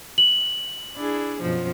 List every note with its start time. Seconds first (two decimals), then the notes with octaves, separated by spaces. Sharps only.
0.18 F#7
0.95 D4 E4 G#4
1.41 F#2 B2 F3